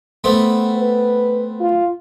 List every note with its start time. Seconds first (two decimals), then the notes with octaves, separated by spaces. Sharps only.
0.24 A3 B3 C4
0.77 B4
1.60 F4